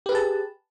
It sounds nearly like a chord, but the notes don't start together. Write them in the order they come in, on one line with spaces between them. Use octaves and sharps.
G4 B4 G#4 A5